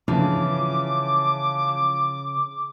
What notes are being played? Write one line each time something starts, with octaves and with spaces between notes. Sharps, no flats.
C#3 E3 F3 D6